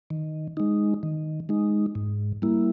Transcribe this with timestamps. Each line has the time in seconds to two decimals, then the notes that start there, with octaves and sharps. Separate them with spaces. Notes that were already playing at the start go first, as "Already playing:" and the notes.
0.10 D#3
0.57 G#3 D#4
1.03 D#3
1.49 G#3 D#4
1.95 G#2
2.42 G3 A#3 E4